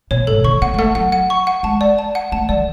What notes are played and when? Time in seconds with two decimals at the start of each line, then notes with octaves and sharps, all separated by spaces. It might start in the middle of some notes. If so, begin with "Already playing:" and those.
0.11 B2 C#5
0.27 G#2 A4
0.44 D3 C#6
0.62 B3 F#5
0.74 G#3
0.79 A3 F#5
0.95 F#3 F#5
1.12 F#5
1.30 C#6
1.47 F#5
1.63 G#3 A5
1.81 D5
1.98 A5
2.15 F#5
2.32 A3 A5
2.49 G#3 D5
2.58 D3